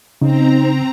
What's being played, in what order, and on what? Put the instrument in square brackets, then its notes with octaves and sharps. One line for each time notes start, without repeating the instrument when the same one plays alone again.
[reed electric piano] C#3 [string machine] C4 A#5 [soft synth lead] D#4